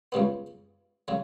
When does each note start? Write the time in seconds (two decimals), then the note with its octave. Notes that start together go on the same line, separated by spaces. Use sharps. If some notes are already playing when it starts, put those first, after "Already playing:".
0.12 C#2 C#3 G3 B3
1.08 C#3 F#3